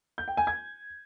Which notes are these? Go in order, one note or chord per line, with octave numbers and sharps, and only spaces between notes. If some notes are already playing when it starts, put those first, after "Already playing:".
G6
G5
G#5
G#6